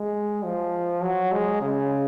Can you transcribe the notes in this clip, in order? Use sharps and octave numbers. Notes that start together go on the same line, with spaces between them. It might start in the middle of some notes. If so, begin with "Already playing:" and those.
Already playing: G#3
F3
F#3
G#3
C#3